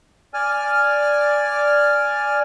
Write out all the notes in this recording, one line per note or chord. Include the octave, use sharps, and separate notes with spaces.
D5 G#5 F6